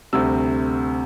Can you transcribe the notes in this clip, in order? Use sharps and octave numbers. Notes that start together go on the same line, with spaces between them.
D2 C3 G3 E6